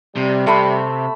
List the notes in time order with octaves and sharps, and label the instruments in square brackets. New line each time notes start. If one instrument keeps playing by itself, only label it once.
[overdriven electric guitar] C3 [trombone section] G3
[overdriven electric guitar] C3 [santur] A3 E5 B5